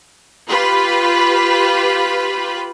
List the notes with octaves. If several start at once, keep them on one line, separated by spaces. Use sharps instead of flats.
F4 G4 B4 B5